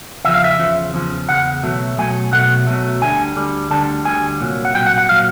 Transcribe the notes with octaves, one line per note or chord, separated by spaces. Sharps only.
E2 C#3 F3 E5
F5
E5
E2 C#3 F3
E2 C#3 F3
E2 C#3 F#5
B2 F#3 A3
B2 F#3 A3 G#5
B2 F#3 A3 F#5
B2 F#3 A3
D2 D3 G3 G#5
D2 D3 G3
D2 D3 G3 A5
D2 D3 G3 G#5
C2 A#2 F#3
F#5
C2 A#2 F#3 G5
F#5
F#5
A#2 F#3 F5